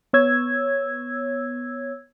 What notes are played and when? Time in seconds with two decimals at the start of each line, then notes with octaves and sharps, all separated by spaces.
0.13 B3 C#5 E6 G#6